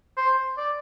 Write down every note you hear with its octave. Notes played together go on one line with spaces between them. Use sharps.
C5
D5